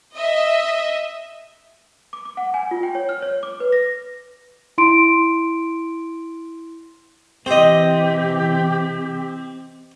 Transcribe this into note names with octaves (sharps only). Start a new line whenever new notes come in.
D#5 E5
D6
D6
F#5
G#5
F4
G5
C#5
F6
C#5
D6
B4
A#6
E4 C6 D7
C3 E3 C4 G4 C5 D#5